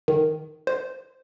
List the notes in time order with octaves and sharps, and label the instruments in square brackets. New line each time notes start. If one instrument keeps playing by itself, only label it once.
[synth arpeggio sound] D#3
C5